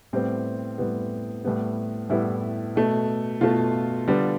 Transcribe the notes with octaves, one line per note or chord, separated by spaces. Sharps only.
A2 G3 B3 C4
A2 G3 B3
A2 G3 B3
A2 G3 B3 E4
B2 A3
B2 A3 F4
D3 G3 B3